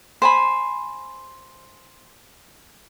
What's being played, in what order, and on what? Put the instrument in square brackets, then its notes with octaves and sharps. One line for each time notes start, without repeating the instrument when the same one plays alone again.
[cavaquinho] C5 G#5 B5